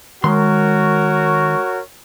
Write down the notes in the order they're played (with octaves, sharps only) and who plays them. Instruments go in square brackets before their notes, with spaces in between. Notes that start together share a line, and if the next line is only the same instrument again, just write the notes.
[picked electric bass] D#3 [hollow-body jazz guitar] G#3 C6 [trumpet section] F#4 A#4 C#5